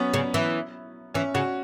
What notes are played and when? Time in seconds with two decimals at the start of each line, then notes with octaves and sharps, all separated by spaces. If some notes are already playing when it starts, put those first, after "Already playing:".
Already playing: F#3 B3 C#4
0.14 C#3
0.34 E3
1.14 E3 C#4
1.34 C#3 F#4